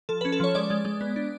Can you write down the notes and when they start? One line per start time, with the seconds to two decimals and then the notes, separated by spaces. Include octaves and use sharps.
0.09 F3 A4
0.21 C#4 B4
0.32 A4
0.40 F3 C#5
0.55 G#3 D5
0.70 G#3
0.85 G#3
1.01 B3
1.16 D4